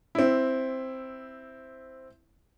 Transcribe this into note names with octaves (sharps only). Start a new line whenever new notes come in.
C4 E4